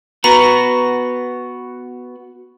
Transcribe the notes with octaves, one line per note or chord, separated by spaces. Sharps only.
B3 F#4 B4 A#5